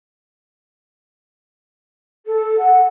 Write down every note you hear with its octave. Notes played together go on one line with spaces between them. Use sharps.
A4
F#5